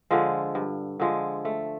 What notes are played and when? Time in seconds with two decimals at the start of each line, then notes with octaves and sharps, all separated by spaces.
0.10 D3 F3 G#3
0.55 G2
1.00 D3 F3 G#3
1.45 A3